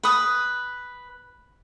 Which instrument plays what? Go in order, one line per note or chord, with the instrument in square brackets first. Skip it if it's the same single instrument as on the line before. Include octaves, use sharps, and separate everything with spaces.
[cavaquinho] B4 D#6